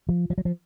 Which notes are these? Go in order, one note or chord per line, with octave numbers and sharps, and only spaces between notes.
F3
F3
F#3
F3